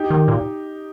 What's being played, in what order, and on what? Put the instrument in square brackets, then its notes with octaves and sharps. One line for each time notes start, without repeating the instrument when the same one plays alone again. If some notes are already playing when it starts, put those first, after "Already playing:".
Already playing: [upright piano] D#4 G4
[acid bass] D#3
A#2